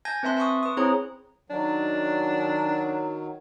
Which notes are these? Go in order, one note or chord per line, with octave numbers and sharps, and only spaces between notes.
G#5 A5 G6 G#6 A#6
C4 B4 E5 A5 C6 F#6
A5 C6 C#6 D#6
B4 D#6
C4 E4 G#4 C5 C#5 A#5
D#3 F#3 D4